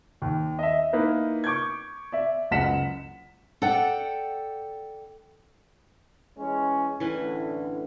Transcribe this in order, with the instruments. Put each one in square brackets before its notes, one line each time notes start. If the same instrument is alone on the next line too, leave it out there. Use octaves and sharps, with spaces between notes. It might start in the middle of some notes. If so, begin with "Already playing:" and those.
[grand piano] D#2
D#5 E5
A#3 D#4 E4 B4
C#6 D6 G6 G#6
D5 E5
F#1 C#2 F#5 B6 E7
[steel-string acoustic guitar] A4 D5 F#5 G5
[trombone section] E3 G#3 C#4
[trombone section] A2 D3 [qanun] E3 C#4 B4